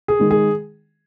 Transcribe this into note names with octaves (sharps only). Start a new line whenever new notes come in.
G#4
D#3 G#3
G#4